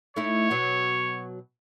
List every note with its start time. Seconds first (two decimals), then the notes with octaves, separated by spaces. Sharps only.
0.16 A3 D#4 E4 C#5
0.50 B2 F#3